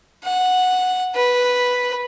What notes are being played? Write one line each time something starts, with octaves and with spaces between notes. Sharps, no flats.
F#5
B4